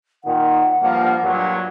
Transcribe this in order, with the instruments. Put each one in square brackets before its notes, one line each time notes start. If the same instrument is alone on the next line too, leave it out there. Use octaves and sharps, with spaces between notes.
[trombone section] A#2 D#3 [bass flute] F#5
[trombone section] G2 F3 A#3
G2 A#2 F#3